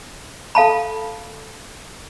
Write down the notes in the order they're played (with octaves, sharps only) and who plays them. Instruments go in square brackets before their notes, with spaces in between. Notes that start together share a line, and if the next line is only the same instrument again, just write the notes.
[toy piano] A4 F5 A5 B5